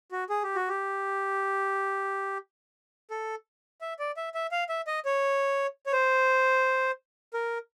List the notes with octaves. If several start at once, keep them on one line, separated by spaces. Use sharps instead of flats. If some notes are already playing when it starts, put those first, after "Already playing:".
F#4
G#4
G4
F#4
G4
A4
E5
D5
E5
E5
F5
E5
D#5
C#5
C#5
C5
A#4